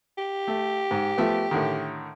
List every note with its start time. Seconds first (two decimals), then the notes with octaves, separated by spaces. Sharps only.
0.18 G4
0.48 A3
0.91 G#2
1.17 F3 A3 B3
1.51 A2 D3 D#3